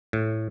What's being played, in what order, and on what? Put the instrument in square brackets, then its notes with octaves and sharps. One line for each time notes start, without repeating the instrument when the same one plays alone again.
[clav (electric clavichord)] A2